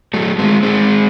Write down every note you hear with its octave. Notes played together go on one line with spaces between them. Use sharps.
F#3 A3
G#3 C4
G#3 C4